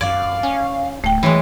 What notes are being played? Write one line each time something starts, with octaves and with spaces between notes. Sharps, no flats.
F#2 D5 F5 G#6
C#4 G#5
D1 A3 G5
E3 F#3 G#3 C#5